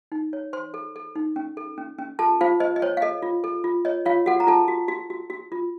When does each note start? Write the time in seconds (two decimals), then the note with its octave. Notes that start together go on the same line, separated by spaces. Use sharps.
0.12 D#4
0.33 C#5
0.53 C5 C6
0.74 A4
0.96 A4
1.15 D#4
1.36 C#4
1.57 A4
1.78 C#4
1.98 C#4
2.19 F4 A4 A5
2.41 F4 C5 F5
2.60 C5 D#5
2.76 D#5
2.82 C5 C#5
2.97 F5
3.02 A4 D#5
3.22 F4
3.44 A4
3.64 F4
3.85 C#5 D#5
4.06 F4 C#5 F5
4.26 F#4 A4 F#5
4.40 A#5
4.47 F4 A4 A5
4.68 F#4
4.88 F#4
5.10 F#4
5.30 F#4
5.52 F4